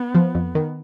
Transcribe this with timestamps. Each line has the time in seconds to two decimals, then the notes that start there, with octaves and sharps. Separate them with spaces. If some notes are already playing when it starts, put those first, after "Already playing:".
Already playing: B3
0.15 F3
0.35 F2
0.55 D#3